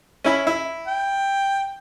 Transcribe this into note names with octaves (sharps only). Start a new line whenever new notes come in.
C#4 E4 B5
E4
G5